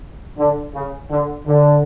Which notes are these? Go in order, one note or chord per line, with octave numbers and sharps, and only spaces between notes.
D3
C#3
D3
D3